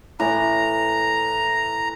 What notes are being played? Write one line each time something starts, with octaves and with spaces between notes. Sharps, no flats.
A2 E3 A#5